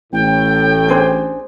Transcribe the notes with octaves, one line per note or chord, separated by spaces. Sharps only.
A1 A2 G5
D4 G#4 C5